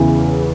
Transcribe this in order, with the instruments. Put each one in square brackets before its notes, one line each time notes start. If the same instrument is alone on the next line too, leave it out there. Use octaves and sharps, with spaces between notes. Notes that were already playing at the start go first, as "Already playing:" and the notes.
Already playing: [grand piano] E2 C#3 E3